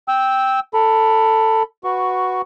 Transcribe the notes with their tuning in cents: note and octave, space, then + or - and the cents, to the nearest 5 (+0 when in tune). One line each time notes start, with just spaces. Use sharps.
G5 +0 E6 -10
A4 +15 B5 -5
F#4 +0 B4 +0 C#6 +10